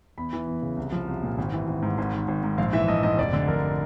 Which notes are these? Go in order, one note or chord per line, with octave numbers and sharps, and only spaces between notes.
E2 B5
E3
E2
C#3
C2
F3
C2
A#2
G#1
E3
G#1
G#2
G#1
D#3
G#1
G#2
A#1 F5
E3 E5
A#1 D#5
G#2 D#5
F1 D5
D3
F1 A#4